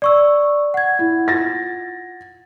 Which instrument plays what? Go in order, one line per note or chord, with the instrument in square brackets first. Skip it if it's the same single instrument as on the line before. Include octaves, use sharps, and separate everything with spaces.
[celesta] D5 C#6 E6
F#5 G#6
[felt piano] E4
F4 A6 A#6